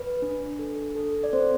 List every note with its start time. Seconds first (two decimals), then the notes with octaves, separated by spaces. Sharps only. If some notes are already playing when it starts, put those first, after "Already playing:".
Already playing: B4
0.22 D4
0.59 A4
0.95 A4
1.24 D5
1.33 C4 C5